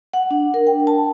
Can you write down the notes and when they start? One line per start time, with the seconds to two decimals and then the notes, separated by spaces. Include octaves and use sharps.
0.14 F#5
0.31 D4
0.54 A#4
0.67 G5
0.87 A5